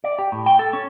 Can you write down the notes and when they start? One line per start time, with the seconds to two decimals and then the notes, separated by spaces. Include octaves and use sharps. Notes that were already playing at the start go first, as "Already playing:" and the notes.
0.04 D5
0.19 G4
0.32 A2
0.46 G5
0.59 A4
0.73 C#4